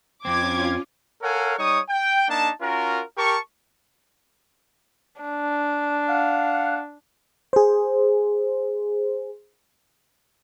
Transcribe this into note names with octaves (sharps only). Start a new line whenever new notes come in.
F2 C4 C#4 F4 D6 G#6
A4 A#4 C#5 F5 F#5 G#5
G3 D#4 C#5 C#6 D#6
G5
A#3 D4 D#4 A5
C#4 F4 F#4 A#4
G4 A#4 A5 C#6
D4
F5 F#5
G#4 C5